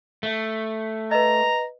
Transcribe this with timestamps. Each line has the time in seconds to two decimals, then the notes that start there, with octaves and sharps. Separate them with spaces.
0.23 A3
1.11 B4 D#5 A#5